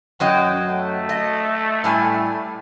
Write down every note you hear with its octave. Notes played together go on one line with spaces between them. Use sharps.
F#2 F#3 D#5 G5
A3
D#5
A2 G3 G#5